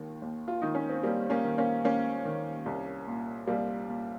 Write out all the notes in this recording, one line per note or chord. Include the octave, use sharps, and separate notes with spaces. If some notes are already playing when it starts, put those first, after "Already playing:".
Already playing: D#2 D#3
D#2
F4
D#3 D#4
C#4
C4
D#2 G3 A#3
A#3 C#4
D#3
A#3 C#4
D#2 A#3 C#4
D#3
C2
A#2
C2 G3 A#3
A#2